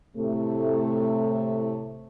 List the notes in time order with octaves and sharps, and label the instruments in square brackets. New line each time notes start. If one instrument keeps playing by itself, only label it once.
[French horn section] A2 C3 A3